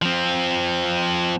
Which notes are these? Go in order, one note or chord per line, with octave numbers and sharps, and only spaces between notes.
F3 C4